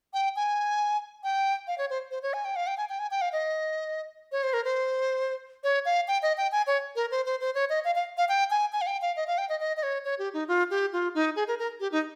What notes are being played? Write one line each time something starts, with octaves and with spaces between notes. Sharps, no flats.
G5
G#5
G5
F5
C#5
C5
C5
C#5
G#5
G5
F5
G5
G#5
G5
G#5
G5
F5
D#5
C#5
C5
A#4
C5
C#5
F5
G5
D#5
G5
G#5
C#5
A#4
C5
C5
C5
C#5
D#5
F5
F5
F5
G5
G#5
G#5
F5
G5
F5
D#5
F5
G5
D#5
D#5
D#5
C#5
C#5
G4
D#4
F4
G4
F4
D#4
G#4
A#4
A#4
G4
D#4